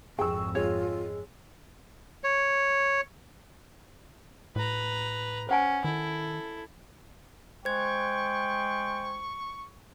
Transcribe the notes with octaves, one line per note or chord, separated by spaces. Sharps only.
G#1 F2 G#4 G5 C#6 E6
G#3 F4 C#5
C#5
A2 B4 A#5
C#4 C5 F#5 G#5
D#3 E4 A4
G#3 C5 G5 C#6 G#6